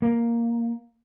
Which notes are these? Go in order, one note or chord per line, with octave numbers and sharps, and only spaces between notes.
A#3